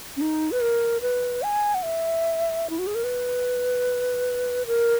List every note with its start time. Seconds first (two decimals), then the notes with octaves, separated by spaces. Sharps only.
0.17 C#4
0.21 D#4
0.52 B4
0.61 A#4
1.01 B4
1.43 G#5
1.74 F#5
1.83 E5
2.70 E4
2.79 F#4
2.87 G#4
2.95 A#4
3.04 B4
4.66 A#4